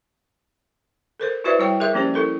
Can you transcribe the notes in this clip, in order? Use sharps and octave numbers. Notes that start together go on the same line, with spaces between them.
A4 A#4 C5
E4 F#4 B4 C5 D5 E5
G3 E4 C#5 G5
G#4 A#4 E5
F3 A#3 C#4 G4 C5
E4 A4 A#4